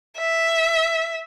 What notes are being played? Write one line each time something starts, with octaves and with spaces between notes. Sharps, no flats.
E5